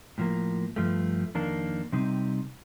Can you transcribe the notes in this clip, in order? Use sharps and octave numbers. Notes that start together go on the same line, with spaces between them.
A2 F3 A#3
G2 F3 A3
F2 D#3 A#3 D4
C3 G3 C4 D#4